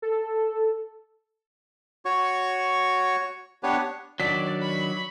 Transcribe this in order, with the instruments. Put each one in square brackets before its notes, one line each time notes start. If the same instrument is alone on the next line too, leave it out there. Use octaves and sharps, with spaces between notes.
[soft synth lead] A4
[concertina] F#4 C#5 C#6
B3 D4 G4 B4 C#5
[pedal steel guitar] D#3 F#4 [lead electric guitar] F#3 D4 [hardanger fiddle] D5 [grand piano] B6
[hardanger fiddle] B5 C#6